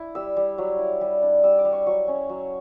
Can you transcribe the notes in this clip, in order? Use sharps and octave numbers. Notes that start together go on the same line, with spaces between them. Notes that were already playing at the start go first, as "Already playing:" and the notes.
Already playing: D4 E4
G3 E6
G3
F#3
E4
G3
D4
G3 E6
D6
G3
C#6
F#3 C#6
C#4
F#3